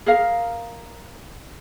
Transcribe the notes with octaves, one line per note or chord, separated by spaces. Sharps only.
G#4 A#4 F5